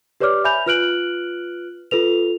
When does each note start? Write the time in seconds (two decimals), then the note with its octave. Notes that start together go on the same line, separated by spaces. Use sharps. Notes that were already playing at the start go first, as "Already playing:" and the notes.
0.20 G4 B4 C#5 D5 D6 F6
0.44 E5 G#5 B5 G6 F7
0.66 F4 B4 F6 F#6 D7 F#7
1.91 F4 A4 B4 F7